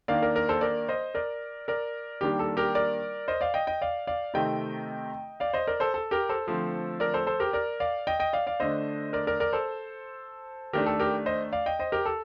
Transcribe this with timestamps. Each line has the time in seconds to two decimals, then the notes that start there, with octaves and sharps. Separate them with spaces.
0.08 D#3 A#3 D4 D5 F5
0.22 A#4 D5
0.35 A#4 D5
0.49 A4 C5
0.61 A#4 D5
0.89 C5 D#5
1.15 A#4 D5
1.68 A#4 D5
2.21 D#3 G3 A#3 D4 G4
2.39 A4
2.57 G4 A#4
2.75 A#4 D5
3.28 C5 D#5
3.41 D5 F5
3.54 D#5 G5
3.67 D#5 G5
3.82 D5 F5
4.07 D5 F5
4.34 C3 D#3 A3 C4 D#5 G5
5.40 D5 F5
5.54 C5 D#5
5.67 A#4 D5
5.80 A4 C5
5.94 A4
6.11 G4 A#4
6.29 A4 C5
6.47 D3 F3 A3 C4
7.00 A#4 D5
7.14 A4 C5
7.27 A4 C5
7.40 G4 A#4
7.53 A#4 D5
7.80 D5 F5
8.07 D#5 G5
8.20 D#5 G5
8.33 D5 F5
8.47 D5 F5
8.60 D3 A3 D4 C5 D#5
9.13 A#4 D5
9.27 A#4 D5
9.40 A#4 D5
9.53 A4 C5
10.73 D#3 A3 D4 G4 A#4
10.86 A4
10.99 G4 A#4
11.26 C5 D#5
11.53 D5 F5
11.66 D#5 G5
11.79 C5 D#5
11.92 G4 A#4
12.06 A4